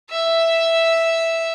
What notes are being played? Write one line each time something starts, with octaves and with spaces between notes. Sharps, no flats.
E5